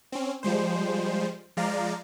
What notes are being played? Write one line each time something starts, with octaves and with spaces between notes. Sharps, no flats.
C4 C#4
F3 G3 G#3 C5
F3 G#3 D5 F5 A#5